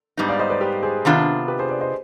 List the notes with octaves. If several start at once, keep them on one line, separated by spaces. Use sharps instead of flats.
G#2 G3 B3 D#4
D5 F5
C5 D#5
B4 D5
G4 B4
G#4 C5
C3 D#3 B3 D4 F4
G4 B4
G#4 C5
B4 D5
C5 D#5